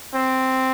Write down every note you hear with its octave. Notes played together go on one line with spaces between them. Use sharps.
C4